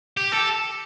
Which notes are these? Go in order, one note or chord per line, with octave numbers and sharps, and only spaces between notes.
G4
A4